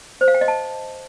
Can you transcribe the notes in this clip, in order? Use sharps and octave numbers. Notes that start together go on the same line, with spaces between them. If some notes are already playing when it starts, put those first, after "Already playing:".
C5
F5
G5
D#5
A5